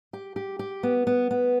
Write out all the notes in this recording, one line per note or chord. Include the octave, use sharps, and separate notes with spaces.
G4
G4
G4
B3
B3
B3